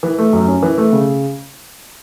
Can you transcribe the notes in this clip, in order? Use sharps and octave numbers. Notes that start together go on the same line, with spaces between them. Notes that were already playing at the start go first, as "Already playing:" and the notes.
E3
A3
F#2
C#4
E3
A3
C#3